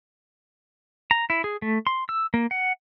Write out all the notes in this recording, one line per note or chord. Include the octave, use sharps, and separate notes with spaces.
A#5
E4
G#4
A3
C6
E6
A#3
F#5